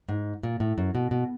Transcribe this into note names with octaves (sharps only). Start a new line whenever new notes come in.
G#2
A#2
A2
F#2
B2
B2